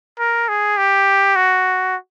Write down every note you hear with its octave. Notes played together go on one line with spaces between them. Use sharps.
A#4
G#4
G4
F#4